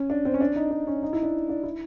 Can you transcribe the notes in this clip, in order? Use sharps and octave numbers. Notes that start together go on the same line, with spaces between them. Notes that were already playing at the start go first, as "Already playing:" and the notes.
Already playing: C#4
D4
C4
C#4
D4
D#4
D4
C#4
D#4
E4
D4
D4
E4